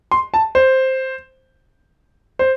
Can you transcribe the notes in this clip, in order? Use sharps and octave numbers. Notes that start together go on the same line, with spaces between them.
C6
A5
C5
C5